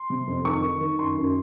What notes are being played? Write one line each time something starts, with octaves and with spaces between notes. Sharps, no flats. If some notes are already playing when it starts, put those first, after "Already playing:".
Already playing: C6
C3
F2
D#3 C#6
D#3
D#3
F#2 C6
F#2